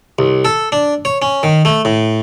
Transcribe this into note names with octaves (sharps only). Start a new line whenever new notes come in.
C2
A4
D4
C#5
C#4
D#3
A3
A2